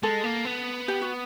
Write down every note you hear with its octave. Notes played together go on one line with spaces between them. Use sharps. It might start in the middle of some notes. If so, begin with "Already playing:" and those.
G#3 A4
A#3
B3
G4
F#4